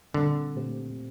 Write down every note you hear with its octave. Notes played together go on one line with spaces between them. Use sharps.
A#2 D3 G3 C4
A#2 A3 C4 G4 C5